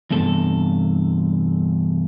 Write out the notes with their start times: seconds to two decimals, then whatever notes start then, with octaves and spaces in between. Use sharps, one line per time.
0.11 E2 G2 C3 A4